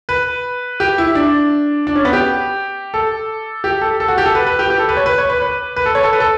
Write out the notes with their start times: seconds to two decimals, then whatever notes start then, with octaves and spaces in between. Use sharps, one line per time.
0.09 B4
0.80 G4
0.98 E4
1.15 D4
1.87 D4
1.96 C#4
2.05 B3
2.13 G4
2.94 A4
3.64 G4
3.81 A4
4.00 A4
4.08 F#4
4.18 G4
4.26 A4
4.35 B4
4.47 B4
4.59 G4
4.70 G4
4.79 A4
4.89 B4
4.97 C#5
5.06 B4
5.18 C#5
5.30 B4
5.42 B4
5.76 B4
5.86 A4
5.95 C#5
6.03 A4
6.13 B4
6.20 A4